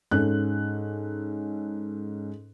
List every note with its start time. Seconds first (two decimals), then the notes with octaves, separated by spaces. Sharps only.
0.11 G#2 C#4 A4 F#6